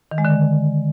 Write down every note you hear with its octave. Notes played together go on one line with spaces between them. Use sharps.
D#3
G#3
D3